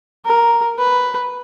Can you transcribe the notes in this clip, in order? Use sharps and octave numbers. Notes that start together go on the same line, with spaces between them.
A#4
B4